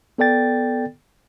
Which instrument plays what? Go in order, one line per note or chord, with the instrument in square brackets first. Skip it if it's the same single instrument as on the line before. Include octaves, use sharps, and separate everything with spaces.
[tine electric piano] B3 A4 D5 G5 A6